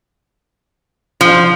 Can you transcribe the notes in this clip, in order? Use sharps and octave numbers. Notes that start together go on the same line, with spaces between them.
F3